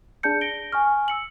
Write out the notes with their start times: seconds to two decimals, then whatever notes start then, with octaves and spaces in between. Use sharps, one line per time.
0.23 D4 G#4 D5 A5 G6 C#7
0.41 A#6 D7 G7
0.72 G#5 C#6 F6
1.08 E6 C#7 F#7